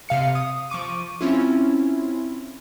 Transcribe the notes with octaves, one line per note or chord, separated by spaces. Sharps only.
C3 F5 C#7
D#6
F3 C#6 D6 D#7
C4 C#4 E4 F4